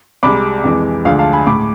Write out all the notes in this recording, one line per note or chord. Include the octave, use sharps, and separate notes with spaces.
C2 C3 G#3 B5 D6
F2 E3 G#3
D2 D3 F3 G#3 F5
F5 A5
G#5 B5
A2 G#3 B5 D6